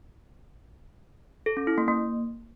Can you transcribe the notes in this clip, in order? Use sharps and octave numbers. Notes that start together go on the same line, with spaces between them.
A4
C#4
E4
A#3
A#3